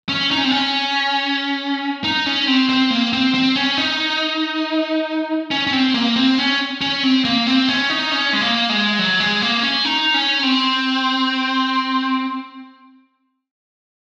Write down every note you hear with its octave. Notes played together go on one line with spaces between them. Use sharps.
C#4
D#4
C#4
C4
C#4
D#4
C#4
C4
C4
A#3
C4
C4
C#4
D#4
C#4
C#4
C4
A#3
C4
C#4
C#4
C4
A#3
C4
C#4
D#4
C#4
G#3
A#3
G#3
F#3
G#3
A#3
C#4
D#4
C#4
C4